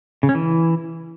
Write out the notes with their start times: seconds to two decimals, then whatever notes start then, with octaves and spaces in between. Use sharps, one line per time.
0.23 C#3
0.29 C#4
0.35 E3